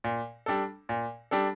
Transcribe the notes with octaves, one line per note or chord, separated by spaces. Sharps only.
A#2
G3 D4 A4
A#2
G3 D4 A4